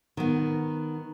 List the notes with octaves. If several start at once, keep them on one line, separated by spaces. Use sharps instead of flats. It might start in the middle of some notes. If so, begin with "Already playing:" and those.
D#3 B3